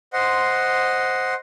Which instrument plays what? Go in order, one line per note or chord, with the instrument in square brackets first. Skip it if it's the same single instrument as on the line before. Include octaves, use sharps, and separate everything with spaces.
[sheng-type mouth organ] C5 D#5 F#5 C6